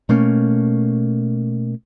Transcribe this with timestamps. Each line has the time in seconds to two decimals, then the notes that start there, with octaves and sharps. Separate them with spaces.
0.09 B2 A3 A#3 C#4